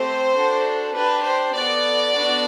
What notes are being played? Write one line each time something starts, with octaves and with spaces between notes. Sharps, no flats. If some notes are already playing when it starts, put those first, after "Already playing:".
Already playing: A3 C4 G4 C5
D4 F#4 A4
D4 G4 B4
C5
B3 F#4 A4 D5
B3 D4 F#4 A4